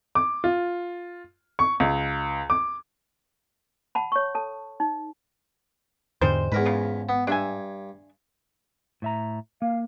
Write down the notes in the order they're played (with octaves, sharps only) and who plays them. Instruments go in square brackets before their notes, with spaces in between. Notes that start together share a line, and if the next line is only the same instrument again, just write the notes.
[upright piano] D6
F4
C#6
C#2
D6
[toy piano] F#5 A5 B5
C#5 C#6
A4 A5
D#4
[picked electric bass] E2 G#2 D3 [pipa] G3 G#3 C5
[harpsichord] E2 A#4 B4 [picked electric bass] G#2
[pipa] C#3 F3
[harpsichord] B3
[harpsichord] G2 [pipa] D4 E5 G#5
[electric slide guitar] A2 E5 A#5
[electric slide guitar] A#3 [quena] F5